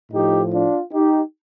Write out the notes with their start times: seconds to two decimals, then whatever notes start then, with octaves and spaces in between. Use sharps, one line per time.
0.12 A2 F3 D#4 G4
0.52 D4 F4
0.91 D#4 G4